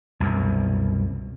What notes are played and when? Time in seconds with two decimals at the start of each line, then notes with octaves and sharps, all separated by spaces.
0.20 C2 F#2 B2